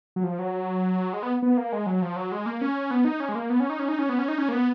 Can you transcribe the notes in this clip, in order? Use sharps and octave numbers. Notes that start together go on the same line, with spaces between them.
F#3
F3
F#3
G#3
B3
B3
A#3
G#3
F#3
F3
F#3
G#3
A#3
C#4
B3
D#4
C#4
G#3
A#3
B3
C#4
D#4
C#4
D#4
C#4
B3
C#4
D#4
C#4
A#3
B3